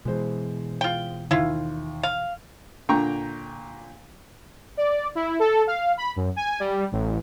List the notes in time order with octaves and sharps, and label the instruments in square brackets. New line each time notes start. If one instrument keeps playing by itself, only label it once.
[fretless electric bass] B2 E3 [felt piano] G#3 C5
[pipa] F4 G5
[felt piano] D#2 [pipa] E4 F4
[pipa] F5
[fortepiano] A#2 D3 G5 A#5 C#6
[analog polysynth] D5
E4
A4
F5
B5
F#2
G#5
G3
A1